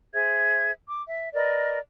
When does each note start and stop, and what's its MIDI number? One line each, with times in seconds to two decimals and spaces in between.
0.14 0.71 68
0.14 0.71 72
0.14 0.71 76
0.14 0.71 92
0.89 1.02 86
1.08 1.29 76
1.34 1.79 70
1.34 1.79 71
1.34 1.79 74
1.34 1.79 75